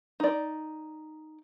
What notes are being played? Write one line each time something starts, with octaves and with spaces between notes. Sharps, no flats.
D#4 D5